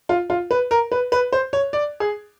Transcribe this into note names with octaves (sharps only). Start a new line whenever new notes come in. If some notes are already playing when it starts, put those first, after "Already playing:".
F4
F4
B4
A#4
B4
B4
C5
C#5
D5
G#4